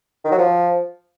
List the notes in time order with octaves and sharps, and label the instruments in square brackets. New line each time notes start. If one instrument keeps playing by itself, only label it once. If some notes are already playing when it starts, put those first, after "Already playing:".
[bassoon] D#3
F#3
F3